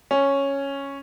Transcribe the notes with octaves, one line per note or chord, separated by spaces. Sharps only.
C#4